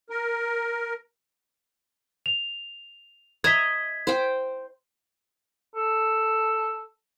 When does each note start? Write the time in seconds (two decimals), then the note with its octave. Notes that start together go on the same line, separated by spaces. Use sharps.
0.10 A#4
2.26 F7
3.44 D#5 E5 A#5 G#6 B6
4.07 C5 G5
5.76 A4